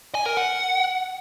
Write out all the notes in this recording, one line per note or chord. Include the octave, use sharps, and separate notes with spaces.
G#5
A#4
F#5